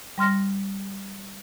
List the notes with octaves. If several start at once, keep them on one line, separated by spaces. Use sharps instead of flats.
G3 C6 F6 A#6